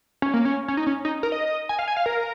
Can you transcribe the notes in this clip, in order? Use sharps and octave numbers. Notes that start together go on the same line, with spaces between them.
C#4
A#3
C#4
C#4
D#4
C#4
D#4
A#4
D#5
G#5
F5
G#5
F5
A#4